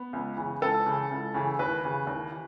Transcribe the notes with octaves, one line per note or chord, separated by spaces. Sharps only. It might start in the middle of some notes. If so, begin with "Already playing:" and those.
Already playing: B3
C#2
C#3 E3
C#2 A4
C#3 E3
C#2
C#3 E3
D#2 B4
C#3 E3
D#2
E3